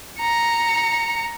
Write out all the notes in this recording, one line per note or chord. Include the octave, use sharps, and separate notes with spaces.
A#5 C#7